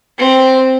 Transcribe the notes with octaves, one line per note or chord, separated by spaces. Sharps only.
C4